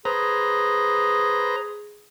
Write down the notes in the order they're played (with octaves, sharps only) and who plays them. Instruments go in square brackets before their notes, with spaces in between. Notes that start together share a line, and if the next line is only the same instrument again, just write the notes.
[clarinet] G#4 [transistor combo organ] B4 C5 A#5